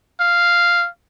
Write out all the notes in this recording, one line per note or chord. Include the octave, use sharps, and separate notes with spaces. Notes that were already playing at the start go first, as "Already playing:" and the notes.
F5